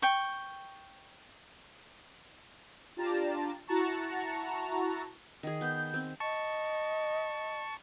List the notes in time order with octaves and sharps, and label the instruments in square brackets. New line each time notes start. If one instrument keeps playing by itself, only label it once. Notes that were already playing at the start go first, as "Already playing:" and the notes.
[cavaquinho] G5 C#6
[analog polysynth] D4 F4 G4 D5 A5 A#5
E4 F#4 F#5 A5 A#5 C#6
[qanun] D#3 G#4
[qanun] B3 [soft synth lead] G6
[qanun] C4
[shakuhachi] D#5 [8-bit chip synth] A5 C#6